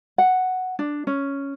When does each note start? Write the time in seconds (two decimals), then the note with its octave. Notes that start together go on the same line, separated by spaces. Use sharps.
0.18 F#5
0.79 D4
1.07 C#4